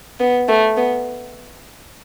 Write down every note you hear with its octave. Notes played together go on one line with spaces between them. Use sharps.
B3
A3
B3